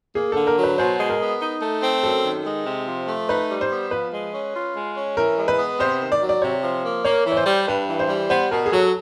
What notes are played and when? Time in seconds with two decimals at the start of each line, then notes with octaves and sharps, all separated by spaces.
0.15 A#3 G#4
0.32 D3 A4
0.47 A#4
0.58 F#3
0.63 B4
0.78 B2 C5
0.99 G#3
1.10 A#4
1.20 B3
1.41 D#4
1.62 A3
1.83 C4
2.03 F#2 A4
2.25 D#3
2.46 G#3
2.66 C3
2.87 F3
3.08 A3
3.29 D#4 B4
3.50 G3
3.61 C5
3.72 B3
3.91 F3 B4
4.13 G#3
4.34 C#4
4.54 F4
4.75 G#3
4.96 C#4
5.17 E3 A#4
5.38 G#3
5.48 B4
5.59 B3
5.80 C3 C5
6.01 D#3
6.12 D5
6.21 F#3
6.29 D5
6.42 C3 C#5
6.64 F3
6.84 A#3
7.05 A#3 C#5
7.26 E3
7.32 C#5
7.37 C5
7.46 G3
7.68 G2 B4
7.89 E3
7.99 C5
8.09 G3
8.30 B3 C5
8.51 B2 A#4
8.66 G#4
8.72 F#3 A4